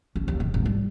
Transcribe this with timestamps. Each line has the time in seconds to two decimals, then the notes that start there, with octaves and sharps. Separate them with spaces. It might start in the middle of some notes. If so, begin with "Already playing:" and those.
0.16 C#4
0.28 D#2
0.40 D1
0.54 G#1
0.65 G3